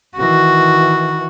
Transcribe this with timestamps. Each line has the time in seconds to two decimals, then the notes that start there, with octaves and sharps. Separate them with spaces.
0.18 D#3 E3 F#4